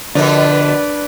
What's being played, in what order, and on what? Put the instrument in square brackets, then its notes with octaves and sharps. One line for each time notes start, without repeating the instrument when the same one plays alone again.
[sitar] B2 F3 [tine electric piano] D3 [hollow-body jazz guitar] D4 A#4 [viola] B4 D5